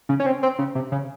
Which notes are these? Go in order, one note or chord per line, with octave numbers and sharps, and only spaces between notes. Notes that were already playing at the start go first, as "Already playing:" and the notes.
C#3
C#4
C4
C4
C#3
C3
C#3